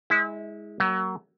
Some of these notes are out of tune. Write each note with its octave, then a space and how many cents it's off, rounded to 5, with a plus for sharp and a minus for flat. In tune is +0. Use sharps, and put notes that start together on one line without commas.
G#3 +0 E4 -30
F#3 +25 A#3 +0